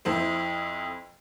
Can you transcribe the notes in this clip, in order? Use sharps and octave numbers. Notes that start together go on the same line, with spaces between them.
F2 E4 C5